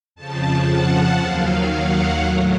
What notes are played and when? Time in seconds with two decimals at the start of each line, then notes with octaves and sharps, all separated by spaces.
0.16 F2 C#3 F3 A5
0.68 F#5
1.19 D#2 D#3 F#3 F5
1.72 F#5
2.24 A2 F#3